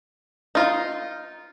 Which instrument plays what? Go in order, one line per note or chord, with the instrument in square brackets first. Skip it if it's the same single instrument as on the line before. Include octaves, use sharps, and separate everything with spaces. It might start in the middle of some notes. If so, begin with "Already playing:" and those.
[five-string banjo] D#4 F4